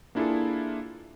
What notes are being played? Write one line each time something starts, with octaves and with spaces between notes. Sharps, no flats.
A#3 D4 E4 F4 G#4 A4